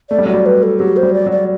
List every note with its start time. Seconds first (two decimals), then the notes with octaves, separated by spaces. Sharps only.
0.10 A3 D5
0.19 G3
0.26 F#3 D5
0.34 G3
0.46 B4
0.63 A4
0.79 F#3 G4
0.97 C5
1.03 G3
1.14 D5
1.26 F#3
1.32 D5